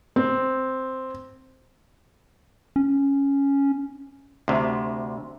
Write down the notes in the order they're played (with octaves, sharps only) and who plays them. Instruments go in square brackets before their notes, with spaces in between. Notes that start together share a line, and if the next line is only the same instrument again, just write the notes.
[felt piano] C4
[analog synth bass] C#4
[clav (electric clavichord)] D2 C3